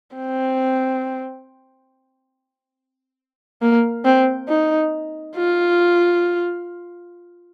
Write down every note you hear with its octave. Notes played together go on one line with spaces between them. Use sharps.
C4
A#3
C4
D#4
F4